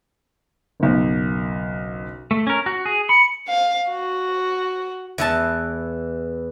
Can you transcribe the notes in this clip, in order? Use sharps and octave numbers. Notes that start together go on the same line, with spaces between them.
F#1 B1
A3
C#4 A#4
F#4
G#4
B5 C#7
F5
F#4
E2 E3 A5